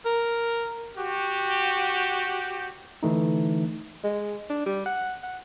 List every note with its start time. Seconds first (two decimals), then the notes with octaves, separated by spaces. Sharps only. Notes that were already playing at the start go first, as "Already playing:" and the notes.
0.05 A#4
0.97 F#4 G4
3.03 D3 E3 A3 D#4
4.04 G#3
4.50 D4
4.66 G3
4.86 F#5
5.23 F#5